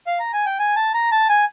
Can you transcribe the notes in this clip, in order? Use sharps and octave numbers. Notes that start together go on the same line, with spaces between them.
F5
A#5
G#5
G5
G#5
A5
A#5
A5
G#5